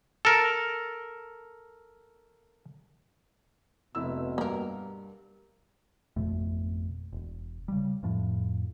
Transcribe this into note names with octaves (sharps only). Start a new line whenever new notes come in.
A4 A#4
F1 B2 E4 E6
G2 A#3 A#4
G#1 F2 B2 A3
E1
C#3 G3
F2 A2 F3